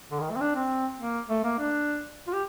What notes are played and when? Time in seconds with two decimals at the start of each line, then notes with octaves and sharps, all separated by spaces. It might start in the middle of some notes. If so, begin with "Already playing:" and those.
0.11 D3
0.20 D#3
0.31 A3
0.36 C4
0.41 D4
0.55 C4
1.00 A#3
1.29 A3
1.44 A#3
1.59 D4
2.27 F4
2.33 G4